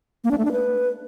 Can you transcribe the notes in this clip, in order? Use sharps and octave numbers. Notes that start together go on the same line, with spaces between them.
A#3
D4
A3
D4
B4